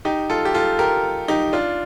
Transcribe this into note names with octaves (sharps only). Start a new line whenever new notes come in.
D#4 G4
F4 A4
G4
F4 A4
G4 A#4
D#4 G4
D4 F4